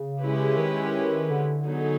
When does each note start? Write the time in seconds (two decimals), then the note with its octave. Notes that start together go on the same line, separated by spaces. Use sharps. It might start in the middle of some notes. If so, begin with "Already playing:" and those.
Already playing: C#3
0.22 G#3 C#4 E4 G4 B4
0.57 D#3
1.30 D3
1.65 F#3 B3 D#4 G#4